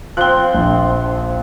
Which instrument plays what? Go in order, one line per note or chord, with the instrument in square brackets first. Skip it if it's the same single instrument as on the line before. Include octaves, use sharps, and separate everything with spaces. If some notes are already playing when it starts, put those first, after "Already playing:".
[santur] F3 C4 [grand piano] F#6 G7
[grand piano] A#1